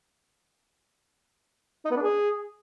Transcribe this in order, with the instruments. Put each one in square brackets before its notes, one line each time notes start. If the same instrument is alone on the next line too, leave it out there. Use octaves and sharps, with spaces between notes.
[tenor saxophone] D#4
B3
D4
G#4